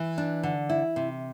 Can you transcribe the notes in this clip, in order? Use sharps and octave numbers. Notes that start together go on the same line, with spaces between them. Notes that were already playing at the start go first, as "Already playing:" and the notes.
Already playing: E3
D4
D3
E4
C3